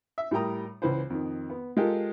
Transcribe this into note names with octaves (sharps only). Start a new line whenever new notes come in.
E5
A2 G3 A#4 G5 A#5 D#6
C#2 E3 B4 C5
F2 D#3
B3
G#3 F4 G4 A4 A#4 G5